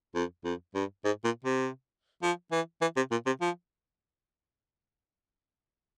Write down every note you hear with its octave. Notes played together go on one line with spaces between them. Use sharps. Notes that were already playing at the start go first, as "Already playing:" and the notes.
F2
F2
G2
G#2
A#2
C3
F3
E3
E3
C3
A#2
C3
F3